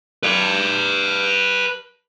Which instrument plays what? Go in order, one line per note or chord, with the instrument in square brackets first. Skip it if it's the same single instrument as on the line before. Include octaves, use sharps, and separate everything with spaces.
[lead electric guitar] B4 D5